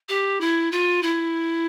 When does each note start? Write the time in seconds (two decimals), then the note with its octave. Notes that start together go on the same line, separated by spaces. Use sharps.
0.09 G4
0.40 E4
0.71 F4
1.02 E4